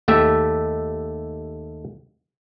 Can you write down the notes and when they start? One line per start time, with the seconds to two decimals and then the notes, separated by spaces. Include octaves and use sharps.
0.08 D#2 A3 G4 E5